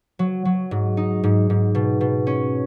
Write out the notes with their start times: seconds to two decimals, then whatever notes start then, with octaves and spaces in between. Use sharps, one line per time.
0.19 F#3
0.45 F#3
0.71 G#2
0.97 D#4
1.24 G#2
1.50 G#2
1.75 B2
2.01 B2
2.27 C#4